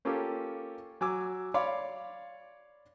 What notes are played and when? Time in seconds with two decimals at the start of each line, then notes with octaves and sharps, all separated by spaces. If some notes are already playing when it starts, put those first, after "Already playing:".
0.05 A#3 C#4 F4 G4 A4
1.01 F#3 G#5 D6 E6
1.54 C#5 D5 F5 B5 C6 D6